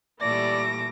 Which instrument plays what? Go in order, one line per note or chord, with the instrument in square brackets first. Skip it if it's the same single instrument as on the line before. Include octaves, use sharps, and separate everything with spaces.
[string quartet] A#2 A3 D6 [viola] E3 G3 [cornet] D5 [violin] A#6